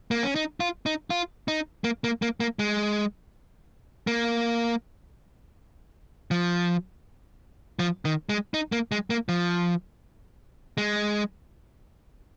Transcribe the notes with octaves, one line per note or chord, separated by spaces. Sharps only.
A#3
C#4
D#4
F4
D#4
F4
D#4
A#3
A#3
A#3
A#3
G#3
A#3
F3
F3
D#3
G#3
D#4
A#3
G#3
A#3
F3
G#3